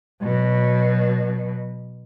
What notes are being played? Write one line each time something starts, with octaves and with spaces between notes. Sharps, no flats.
B2 F#3